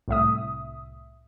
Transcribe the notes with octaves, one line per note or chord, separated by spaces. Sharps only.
C2 A2 E5 D#6